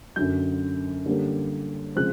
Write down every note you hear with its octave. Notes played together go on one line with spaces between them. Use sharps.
F#2 D3 F#3 G6
D3 G3 A#3 C#4
C#3 F3 G#3 C4 F#6